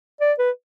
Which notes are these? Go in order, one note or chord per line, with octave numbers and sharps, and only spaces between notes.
D5
B4